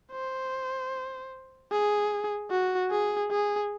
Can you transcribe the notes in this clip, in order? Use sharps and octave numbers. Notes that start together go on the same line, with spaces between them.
C5
G#4
F#4
G#4
G#4